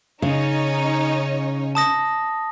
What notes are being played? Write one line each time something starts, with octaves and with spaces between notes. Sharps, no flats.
C#3 C#4 D#4 C#5
A5 D#6 A#6